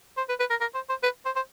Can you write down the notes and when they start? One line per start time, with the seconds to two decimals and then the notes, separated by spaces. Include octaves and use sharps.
0.17 C5
0.29 B4
0.39 B4
0.50 A#4
0.60 A#4
0.75 C5
0.89 C5
1.03 B4
1.25 C5
1.36 C5